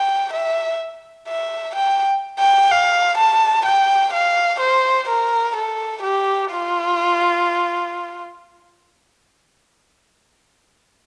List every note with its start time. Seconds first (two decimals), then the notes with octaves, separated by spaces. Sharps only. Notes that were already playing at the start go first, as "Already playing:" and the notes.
Already playing: G5
0.33 E5
1.28 E5
1.76 G5
2.40 G5
2.71 F5
3.18 A5
3.66 G5
4.13 F5
4.60 C5
5.09 A#4
5.56 A4
6.02 G4
6.51 F4